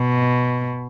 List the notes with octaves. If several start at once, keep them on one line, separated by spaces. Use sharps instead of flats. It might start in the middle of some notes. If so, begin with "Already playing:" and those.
Already playing: B2